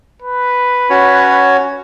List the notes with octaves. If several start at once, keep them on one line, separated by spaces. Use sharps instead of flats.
B4
C#4 F#4 C#5